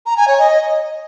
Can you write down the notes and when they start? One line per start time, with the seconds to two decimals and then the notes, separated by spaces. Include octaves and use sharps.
0.06 A#5
0.17 G#5
0.28 C#5
0.39 D#5